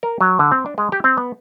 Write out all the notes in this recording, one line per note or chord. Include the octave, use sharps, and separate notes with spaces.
A#4
F#3
D3
C4
D4
G#3
G4
C4
B3